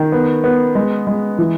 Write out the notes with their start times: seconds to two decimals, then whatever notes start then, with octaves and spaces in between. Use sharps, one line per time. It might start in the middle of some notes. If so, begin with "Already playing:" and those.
Already playing: D#3
0.12 B3
0.44 B3
0.75 G#3
1.07 G#3
1.38 E3